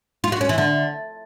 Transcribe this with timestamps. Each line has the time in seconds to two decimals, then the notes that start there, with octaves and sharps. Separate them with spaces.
0.24 F4
0.32 F#4
0.41 C#4
0.49 E3
0.58 D3